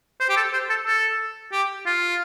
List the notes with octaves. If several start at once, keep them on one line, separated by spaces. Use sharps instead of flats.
C5
G4
A4
C5
A4
A4
G4
F4